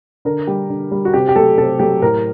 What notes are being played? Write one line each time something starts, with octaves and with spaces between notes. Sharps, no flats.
D3 A#4
G3 G4
D3
G3
F#4
C3 G4
G4
F#3 A3 A4
C3 A4
F#3 A3 G4
A2 A#4